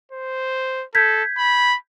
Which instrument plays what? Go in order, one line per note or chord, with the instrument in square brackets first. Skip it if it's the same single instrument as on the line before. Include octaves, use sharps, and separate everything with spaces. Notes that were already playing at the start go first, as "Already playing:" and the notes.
[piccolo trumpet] C5
[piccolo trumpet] A4 [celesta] G6 G#6 B6
[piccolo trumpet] B5